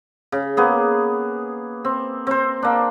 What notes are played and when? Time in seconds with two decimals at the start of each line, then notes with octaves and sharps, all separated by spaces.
0.32 C#3
0.57 A#3 B3 G#4
1.85 C4
2.27 C4 C5
2.62 A#3 D4